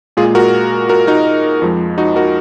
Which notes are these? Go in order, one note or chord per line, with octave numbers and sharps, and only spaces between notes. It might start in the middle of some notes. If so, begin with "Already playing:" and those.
A#2 G#3 F4 G#4
F#4 A#4
F#4 A#4
D#4 F#4
F2 F3 G#3
D#4 F#4
F#4 A#4